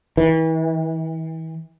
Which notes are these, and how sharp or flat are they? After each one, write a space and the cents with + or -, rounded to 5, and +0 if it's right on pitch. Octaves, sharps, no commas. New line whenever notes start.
E3 -35